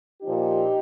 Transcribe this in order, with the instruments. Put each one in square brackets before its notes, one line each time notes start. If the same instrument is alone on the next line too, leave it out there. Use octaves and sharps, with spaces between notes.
[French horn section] A#2 F3 D#4 G4